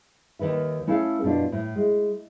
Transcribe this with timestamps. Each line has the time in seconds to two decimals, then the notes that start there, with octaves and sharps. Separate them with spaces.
0.39 D#2 C3 D#3 B4 E5
0.87 A3 C#4 E4 A4 C#5 F5
1.23 F#2 B2 D4 F4
1.52 A2
1.76 G#3